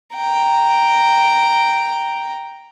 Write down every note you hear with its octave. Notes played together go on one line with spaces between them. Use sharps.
G5 A#5